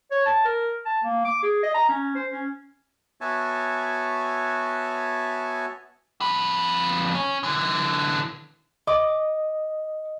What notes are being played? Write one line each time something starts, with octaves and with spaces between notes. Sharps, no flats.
C#5
A5
A#4
A5
A#3
D6
G#4
D#5
A#5
C#4
C5
C#4
B3 F#4 C#5 E5 G#5 A5
F2 B4
C#4
D3 E3
D#5 D6